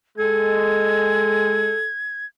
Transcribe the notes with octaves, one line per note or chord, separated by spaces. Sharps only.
G#3 A4 G#6